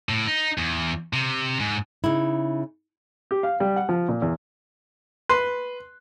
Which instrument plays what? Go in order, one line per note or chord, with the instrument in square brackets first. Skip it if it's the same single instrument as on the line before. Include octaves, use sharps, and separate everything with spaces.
[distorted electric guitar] A2
D#4
E2
C3
G#2
[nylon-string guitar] C#3 D#4 E4
[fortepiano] G4
F5
G3
F#5
F3
A#2
E2
[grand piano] B4 [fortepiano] C6